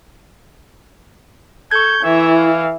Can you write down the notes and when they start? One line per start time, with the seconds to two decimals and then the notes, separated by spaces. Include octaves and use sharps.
1.71 A4 C#6 G6 G#6
2.03 E3 E4 E5
2.38 F5